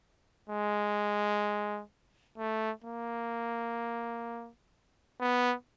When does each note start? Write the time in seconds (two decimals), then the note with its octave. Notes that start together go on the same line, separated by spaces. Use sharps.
0.49 G#3
2.38 A3
2.85 A#3
5.21 B3